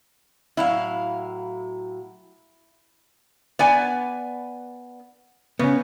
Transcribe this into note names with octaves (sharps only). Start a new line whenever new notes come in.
A2 F#3 E4 F5
B3 D5 G#5
C#3 B3 C#4